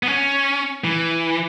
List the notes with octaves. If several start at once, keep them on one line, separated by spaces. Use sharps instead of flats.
B3
C#4
E3